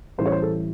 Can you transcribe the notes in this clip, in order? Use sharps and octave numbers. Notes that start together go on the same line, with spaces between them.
A1 A2 E3 G3 C5
C#5
C5
A4